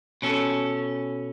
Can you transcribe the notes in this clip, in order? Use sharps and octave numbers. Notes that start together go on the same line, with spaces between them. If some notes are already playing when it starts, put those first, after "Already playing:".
B2 C#4 A4